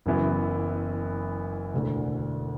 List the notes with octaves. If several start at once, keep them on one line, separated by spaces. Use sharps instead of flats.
F#1 F#2 E3 B3 F#4
E1 D2 D3